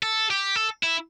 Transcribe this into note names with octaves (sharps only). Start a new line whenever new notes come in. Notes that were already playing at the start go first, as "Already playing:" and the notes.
A4
G4
A4
E4